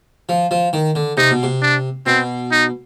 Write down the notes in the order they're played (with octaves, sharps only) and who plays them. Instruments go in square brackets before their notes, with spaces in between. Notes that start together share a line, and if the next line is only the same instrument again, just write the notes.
[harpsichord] F3
F3
D#3
D3
[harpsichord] C3 [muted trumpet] D#4
[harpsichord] B2
C3
[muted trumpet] D4
[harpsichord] B2 [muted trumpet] C4
[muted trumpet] D#4